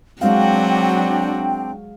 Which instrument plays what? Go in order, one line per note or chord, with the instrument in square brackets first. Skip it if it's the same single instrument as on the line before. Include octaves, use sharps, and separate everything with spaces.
[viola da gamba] F#3 F#4 [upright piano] G#3 F5 [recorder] C4 [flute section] D4 G5